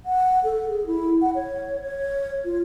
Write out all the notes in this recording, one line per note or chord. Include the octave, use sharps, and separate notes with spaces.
F#5
A4
G#4
E4
F#5
C#5
C#5
F4